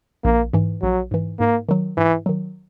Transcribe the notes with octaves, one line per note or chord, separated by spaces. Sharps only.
A#1 A#3
G#2 E3
A#1 F#3
G#2 E3
G#2 A#3
D#3 F#3
G#2 E3
D#3 F#3